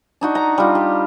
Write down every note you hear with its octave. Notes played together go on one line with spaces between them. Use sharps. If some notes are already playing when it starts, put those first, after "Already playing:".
D4 D#4 F#4
A#5
G3 F4
G4